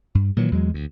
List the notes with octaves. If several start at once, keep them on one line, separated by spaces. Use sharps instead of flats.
G2
A#2 D#3 E3 F#3
E2 F#3 G#3
D2